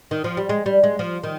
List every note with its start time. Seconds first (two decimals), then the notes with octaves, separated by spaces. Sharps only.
0.11 D#3
0.24 F3
0.37 G3
0.49 G#3
0.66 G3
0.83 G#3
0.99 F3
1.23 D#3